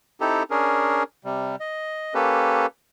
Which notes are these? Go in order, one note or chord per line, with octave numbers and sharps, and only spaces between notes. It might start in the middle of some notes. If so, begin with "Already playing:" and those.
C4 D#4 E4 G4 A4
C#4 D4 G#4 A#4
C3 G3
D#5
A#3 C#4 G4 A4 B4